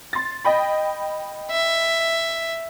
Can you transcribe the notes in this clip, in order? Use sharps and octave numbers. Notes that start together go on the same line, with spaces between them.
C6 A6
D#5 G5 B5
E5